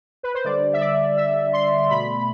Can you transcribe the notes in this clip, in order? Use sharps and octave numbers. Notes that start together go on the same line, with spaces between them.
B4
C5
D3 G3 D5
E5
D5
E5
C6
B2 A3 B5